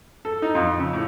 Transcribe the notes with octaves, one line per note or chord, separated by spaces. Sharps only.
A4
D#4
F2
C#3
A2